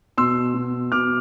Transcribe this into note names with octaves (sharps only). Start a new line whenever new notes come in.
B2 C6 E6
B2
B2 D6 F6